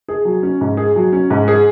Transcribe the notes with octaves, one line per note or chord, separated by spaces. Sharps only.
G#4
F#3
C#4
G#2
G#4
F#3
C#4
G#2
G#4